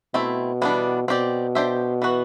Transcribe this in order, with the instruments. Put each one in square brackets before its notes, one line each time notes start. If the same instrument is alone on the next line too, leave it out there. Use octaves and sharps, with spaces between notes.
[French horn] B2 [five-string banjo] A3 C4 E4
[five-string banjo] E3 G3 B3 D4
[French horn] B2 [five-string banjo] C4 G4 D5
[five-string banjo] D4 G4 C5 E5
E3 B3 F#4 B4